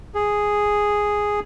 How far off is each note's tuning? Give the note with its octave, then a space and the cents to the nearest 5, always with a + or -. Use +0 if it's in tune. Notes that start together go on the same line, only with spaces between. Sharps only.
G#4 -5